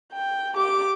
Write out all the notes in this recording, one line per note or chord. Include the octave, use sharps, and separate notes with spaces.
G5
G4 D6